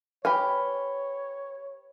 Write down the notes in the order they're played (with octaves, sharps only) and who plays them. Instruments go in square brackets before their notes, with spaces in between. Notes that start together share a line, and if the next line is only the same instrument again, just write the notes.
[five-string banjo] G4 G#5 [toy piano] B4 B5 [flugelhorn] C#5